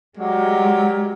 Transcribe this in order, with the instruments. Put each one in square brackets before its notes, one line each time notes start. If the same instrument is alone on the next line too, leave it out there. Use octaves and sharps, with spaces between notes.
[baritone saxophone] F#3 [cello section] G#3 [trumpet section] G4 A#4 D5